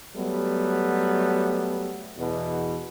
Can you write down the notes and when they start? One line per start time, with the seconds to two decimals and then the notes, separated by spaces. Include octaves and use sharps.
0.16 F#3 G3 A3 B3
2.18 E2 B2